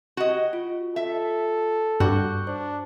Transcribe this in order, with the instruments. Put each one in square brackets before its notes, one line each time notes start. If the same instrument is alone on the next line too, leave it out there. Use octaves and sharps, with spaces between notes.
[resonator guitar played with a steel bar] F#4 D#5 [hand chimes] G4
[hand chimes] F4
[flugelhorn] A4 [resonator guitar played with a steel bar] E5
[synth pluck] G2 [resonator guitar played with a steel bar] F#4 [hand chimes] C#6 D6 G6
[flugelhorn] D4 [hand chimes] C5